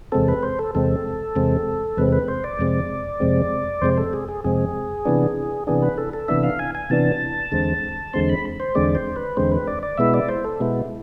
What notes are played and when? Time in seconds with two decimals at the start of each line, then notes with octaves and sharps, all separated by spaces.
0.12 E2 C3 G#3 C4 A4
0.28 B4
0.43 C5
0.59 A4
0.75 E2 C3 G#3 C4 A4
1.36 E2 C3 G#3 C4
1.97 E2 C3 G#3 C4 B4
2.12 B4
2.28 C5
2.44 D5
2.59 F2 C3 G#3 C4
3.20 F2 C3 G#3 C4
3.82 F2 C3 G#3 C4 C5
3.97 A4
4.13 G#4
4.28 G#4
4.44 F2 C3 G#3 C4 G#4
5.05 C3 E3 B3 D4
5.67 C3 E3 B3 D4 G#4
5.82 B4
5.98 A4
6.13 A4
6.28 C3 E3 B3 D4 E5
6.43 F5
6.59 G#5
6.75 G#5
6.90 C3 E3 B3 D4 A5
7.52 E2 D3 G#3 C4
8.13 E2 D3 G#3 C4 C6
8.29 B5
8.60 C5
8.75 E2 D3 G#3 C4 D5
8.95 C5
9.16 B4
9.37 E2 D3 G#3 C4 C5
9.51 B4
9.67 D5
9.83 D5
9.98 B2 G#3 B3 E4 E5
10.14 D5
10.29 C5
10.45 A4
10.60 B2 G#3 B3 E4